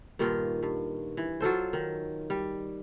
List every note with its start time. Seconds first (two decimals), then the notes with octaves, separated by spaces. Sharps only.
0.19 G2 A#2 D#3 F4
0.63 G2
1.17 E3
1.41 F#3 F4 A4 C5
1.73 D#3
2.30 G3